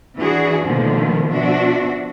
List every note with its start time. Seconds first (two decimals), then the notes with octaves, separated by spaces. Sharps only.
0.16 E3 D4 F#4 G#4
0.66 B2 D3 D#3 F3 A3 A#3
1.30 B2 F3 D4 F#4 E5